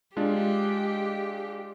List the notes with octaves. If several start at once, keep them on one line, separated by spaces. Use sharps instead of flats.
G#3 D4 F4 G4